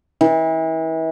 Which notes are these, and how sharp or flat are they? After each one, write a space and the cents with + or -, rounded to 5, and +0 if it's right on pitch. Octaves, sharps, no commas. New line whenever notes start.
E3 -35